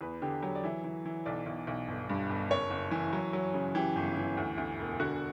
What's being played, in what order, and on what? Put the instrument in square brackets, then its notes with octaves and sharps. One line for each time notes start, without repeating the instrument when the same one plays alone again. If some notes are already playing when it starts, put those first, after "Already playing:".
[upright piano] E2 B4
D3 G4
F#3 G4
D5
E3 E5
E3
E3
B1 D5
B1
B1
G1
G2
G1
F#1 C#5
F#1
E3
F#3
F#3
C#3
E3 G4
G1
E3
D2
D2
E1
D3 F#4